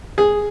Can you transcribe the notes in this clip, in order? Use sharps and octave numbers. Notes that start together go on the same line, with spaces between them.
G#4